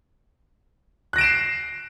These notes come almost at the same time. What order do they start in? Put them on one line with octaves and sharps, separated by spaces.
F#6 A#6 D7 E7 C7